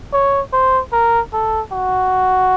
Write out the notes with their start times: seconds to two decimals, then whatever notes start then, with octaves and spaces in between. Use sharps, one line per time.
0.13 C#5
0.53 C5
0.92 A#4
1.33 A4
1.72 F#4